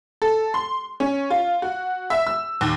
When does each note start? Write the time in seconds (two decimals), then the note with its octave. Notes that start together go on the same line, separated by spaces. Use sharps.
0.22 A4
0.54 C6
1.00 C#4
1.30 F4
1.62 F#4
2.10 E5
2.27 E6
2.61 D#2